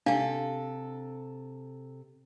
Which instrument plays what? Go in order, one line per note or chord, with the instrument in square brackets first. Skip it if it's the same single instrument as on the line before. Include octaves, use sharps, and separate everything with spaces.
[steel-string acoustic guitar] C3 A4 [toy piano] D4 F5